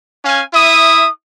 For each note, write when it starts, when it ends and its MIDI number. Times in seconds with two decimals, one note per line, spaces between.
0.25 0.42 61
0.25 0.42 77
0.25 0.42 80
0.54 1.08 64
0.54 1.08 76
0.54 1.08 87